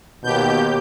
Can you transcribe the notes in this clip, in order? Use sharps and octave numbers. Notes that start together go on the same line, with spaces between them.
D#2 B2 G4 G6